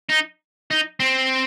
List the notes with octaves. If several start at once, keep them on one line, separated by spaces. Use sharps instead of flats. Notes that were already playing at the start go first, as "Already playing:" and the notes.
D#4
D#4
C4